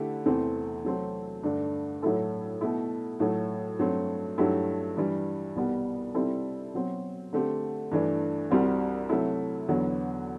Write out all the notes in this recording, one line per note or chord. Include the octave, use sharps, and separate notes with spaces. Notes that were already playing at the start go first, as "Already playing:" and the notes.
Already playing: D3 A3 E4 G4
E2 C3 E3 A3 C4
C3 F#3 A3 C4
G2 D3 A3 D4
A2 F#3 A3 E4 A4
B2 A3 E4
A2 F#3 A3
G2 F#3 A3 C4
G2 F#3 A3 E4 G4
G2 E3 G3
C2 B2 G3 B3
C3 G3 C4 E4 A4
B2 F#3 C4
D3 A3 C4 G4
G2 E3 A3 D4
C2 C3 G3 C4 F#4
C3 F#3 A3 E4
E2 D3 F#3 B3